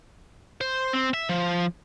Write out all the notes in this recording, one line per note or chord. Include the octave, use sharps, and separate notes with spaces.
C5
C4
E5
F3